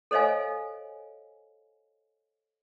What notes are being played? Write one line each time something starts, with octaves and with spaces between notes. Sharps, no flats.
A4 C5 C#5 D#5 F5 G#5